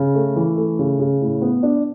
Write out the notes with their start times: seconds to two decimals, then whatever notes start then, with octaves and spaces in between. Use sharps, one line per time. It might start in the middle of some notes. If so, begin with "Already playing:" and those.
Already playing: C#3
0.15 A3
0.36 E3
0.56 A3
0.79 C#3
0.99 C#3
1.21 A2
1.42 B3
1.63 D4